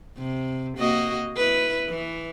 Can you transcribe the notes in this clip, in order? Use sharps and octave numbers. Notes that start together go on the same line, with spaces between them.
C3
A#3 F#4 D#5
E4 B4
E3